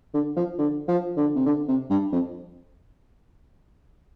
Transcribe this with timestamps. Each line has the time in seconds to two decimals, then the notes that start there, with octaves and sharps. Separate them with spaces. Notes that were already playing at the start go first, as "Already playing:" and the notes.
0.14 D3
0.36 F3
0.58 D3
0.88 F3
1.17 D3
1.35 C3
1.46 D3
1.68 C3
1.90 G2
2.12 F2